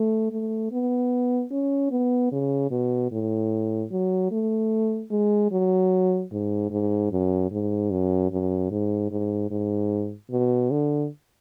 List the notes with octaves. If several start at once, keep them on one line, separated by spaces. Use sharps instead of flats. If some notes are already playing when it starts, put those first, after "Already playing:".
Already playing: A3
A3
B3
C#4
B3
C#3
B2
A2
F#3
A3
G#3
F#3
G#2
G#2
F#2
G#2
F#2
F#2
G#2
G#2
G#2
B2
D3